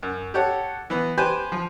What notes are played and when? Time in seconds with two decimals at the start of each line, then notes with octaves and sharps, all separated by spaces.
0.03 F#2
0.34 G4 A4 C#5 F#5
0.90 E3 B3
1.17 G4 B4 C5 G5 G#5
1.52 F3